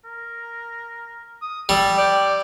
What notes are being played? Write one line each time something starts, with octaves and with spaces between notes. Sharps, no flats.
A#4
D#6
G3 A4
D5 G5